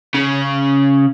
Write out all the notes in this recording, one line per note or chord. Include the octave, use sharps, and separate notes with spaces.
C#3